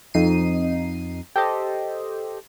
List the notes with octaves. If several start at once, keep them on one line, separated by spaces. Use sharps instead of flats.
F2 D#4 C7 D#7
G4 A4 C5 D#5